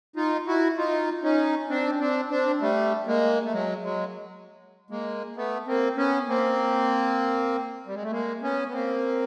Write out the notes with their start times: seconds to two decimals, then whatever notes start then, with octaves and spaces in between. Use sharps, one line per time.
0.16 D#4 F4
0.47 E4 F#4
0.77 D#4 F4
1.23 C#4 D#4
1.69 C4 D4
2.00 C4 D4
2.30 C4 D4
2.61 G3 A3
3.06 G#3 A#3
3.45 A3
3.52 F#3 G#3
3.83 F#3 G#3
4.90 G#3 A#3
5.37 A3 B3
5.67 A#3 C4
5.97 B3 C#4
6.28 A#3 C4
7.87 G3
7.95 G#3
8.03 A3
8.11 G#3 A#3
8.42 B3 C#4
8.68 B3
8.72 A#3 C4